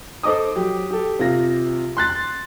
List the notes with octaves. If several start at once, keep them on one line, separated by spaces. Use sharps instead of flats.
A4 C5 D#5 D6 D#6
F#3 G4
G4 A4
C3 F4 A#6
C6 F#6 A6